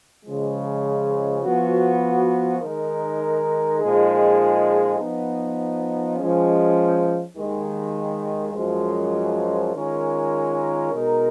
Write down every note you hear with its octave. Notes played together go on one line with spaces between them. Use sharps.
C#3 F3 G#3
F3 B3 F#4
D#3 G#3 D#4 A#4
A#2 F3 G#3 D#4 G#4
F3 B3 D#4
F3 G#3 C#4
D#2 D#3 G#3
F#2 F3 G#3
D#3 G#3 C#4 F4 A#4
B2 G#3 D#4 A#4